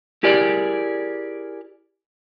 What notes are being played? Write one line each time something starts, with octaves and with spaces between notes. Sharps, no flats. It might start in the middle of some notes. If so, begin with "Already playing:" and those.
E4 G4 G#4 A#4 D5